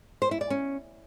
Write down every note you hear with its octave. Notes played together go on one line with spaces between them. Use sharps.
C5
E4
D5
C#4